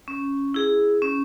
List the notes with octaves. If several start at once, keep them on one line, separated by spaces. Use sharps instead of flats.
C#4
E4 G#4
C#4